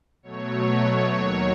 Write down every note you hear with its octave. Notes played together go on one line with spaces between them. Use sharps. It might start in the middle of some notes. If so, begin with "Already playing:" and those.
B2 F#3 A3 C#5
D#2 D#3 F#3 C#5